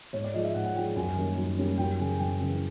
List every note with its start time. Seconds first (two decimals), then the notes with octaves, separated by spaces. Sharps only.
0.13 G#2 C#5
0.24 D5
0.34 F3 G#3 D#5
0.44 E5
0.54 G#2 F#5
0.66 F#5
0.75 F3 G#3 G5
0.96 F#2 G#5
1.16 D#3 G3 A#3 C#4
1.37 F#2
1.58 D#3 G3 A#3 C#4
1.78 F#2 G5
1.99 C#3 E3 G#5
2.19 F#2 G5
2.40 C#3 E3